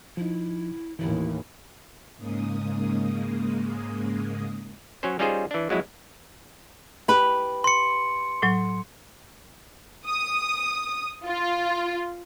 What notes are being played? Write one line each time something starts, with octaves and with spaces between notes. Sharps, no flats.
F3 D#4 E4
A1 D#2 E3 E4
G#2 C#3 G#3 A#3 D#6
F#3 C#4 C5
G3 C#4 D#4 F4 G#4 C5
E3 D4
F2 F#3 G#3 E4
G4 B4
C6 C#7
A2 F#3
D#6
F4